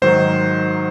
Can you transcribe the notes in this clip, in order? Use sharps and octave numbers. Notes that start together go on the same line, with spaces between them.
G#2 D#3 F#3 C5